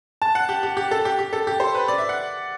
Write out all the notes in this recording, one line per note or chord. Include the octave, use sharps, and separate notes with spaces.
A5
F#5
G4
G4
G4
A4
G4
G4
A4
G4
C5
B4
D5
E5
F#5